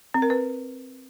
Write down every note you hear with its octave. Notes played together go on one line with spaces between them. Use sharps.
C4
A#4
B4